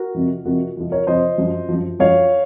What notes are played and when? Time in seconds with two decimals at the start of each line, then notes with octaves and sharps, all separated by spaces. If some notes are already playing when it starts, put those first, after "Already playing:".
Already playing: F#4 A#4
0.15 F2 C3 F3
0.45 F2 C3 F3 F#4 A#4
0.77 F2 C3 F3
0.92 A#4 C#5
1.07 F2 C3 F3 C5 D#5
1.38 F#2 F3
1.69 F#2 F3
1.99 F#2 F3 C#5 F5